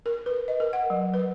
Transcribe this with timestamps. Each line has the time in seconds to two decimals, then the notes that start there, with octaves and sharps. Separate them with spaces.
0.06 A#4
0.26 B4
0.48 D#5
0.60 A#4
0.73 F#5
0.90 F#3
1.14 B4